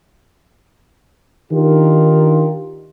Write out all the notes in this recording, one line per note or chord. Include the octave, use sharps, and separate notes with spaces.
D#3 D4 D#4 F4 G4 A#4